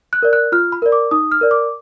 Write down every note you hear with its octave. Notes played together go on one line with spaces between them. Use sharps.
F#6
A#4 D5
F#6
F4 F6
B5
A#4 D5
D6
D#4 D#6
F6
A#4 D5
D6